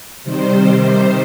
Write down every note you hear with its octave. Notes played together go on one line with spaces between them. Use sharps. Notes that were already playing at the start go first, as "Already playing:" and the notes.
C3 D#3 G3 C5